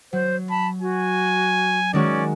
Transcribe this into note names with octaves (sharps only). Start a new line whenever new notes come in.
F#3 C5
A5 B5
F#4 G#5
D#3 G#3 C#4 F#4 D5